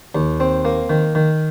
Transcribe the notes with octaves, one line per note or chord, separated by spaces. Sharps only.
D#2
C4
A#3
D#3
D#3